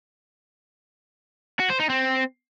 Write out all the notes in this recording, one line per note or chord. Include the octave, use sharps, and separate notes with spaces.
F#4
C5
D#4
C4